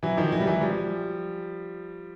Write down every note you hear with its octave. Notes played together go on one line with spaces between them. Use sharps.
E3 F#3
D#3 F3
E3 F#3
G3
E3 F#3
F3 G3